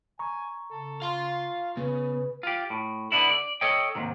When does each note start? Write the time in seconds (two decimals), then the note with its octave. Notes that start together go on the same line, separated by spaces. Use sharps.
0.19 G#5 A#5 C#6
0.71 C#3 A4
1.02 F4 F5 C6
1.77 C#3 B3 B4
2.43 F4 G4
2.70 A2
3.12 D3 B3 D4 E4
3.29 D5
3.61 A4 C#5 D#5 G5
3.95 D#2 G#2 C3 D#3